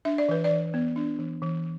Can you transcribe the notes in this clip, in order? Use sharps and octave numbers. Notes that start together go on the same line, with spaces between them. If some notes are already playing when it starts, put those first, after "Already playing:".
D4 E5
D5
E3 B4
D5
E3
B3
D4
E3
E3